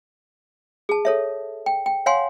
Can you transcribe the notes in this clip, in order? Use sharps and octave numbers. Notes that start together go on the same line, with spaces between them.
G#4 A5
A4 C#5 E5
G5
G5
C#5 F5 F#5 G#5 C6